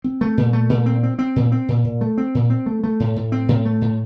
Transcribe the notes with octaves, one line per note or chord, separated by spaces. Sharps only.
C4
A3
A#2
A3
A#2
C4
C4
C4
A#2
C4
A#2
A#2
A3
C4
A#2
C4
A3
A3
A2
A2
C4
A2
A3
A2